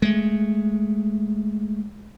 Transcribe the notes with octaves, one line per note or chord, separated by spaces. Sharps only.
G#3 A3